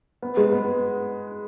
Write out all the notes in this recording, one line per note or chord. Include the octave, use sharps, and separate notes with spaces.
B3
G#3
B3